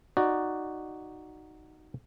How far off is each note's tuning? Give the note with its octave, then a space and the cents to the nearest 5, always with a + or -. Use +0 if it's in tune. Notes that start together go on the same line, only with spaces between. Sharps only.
D#4 -10 F#4 +0 D5 +0